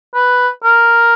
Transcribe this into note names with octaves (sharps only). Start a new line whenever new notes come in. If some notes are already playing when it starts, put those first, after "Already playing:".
B4
A#4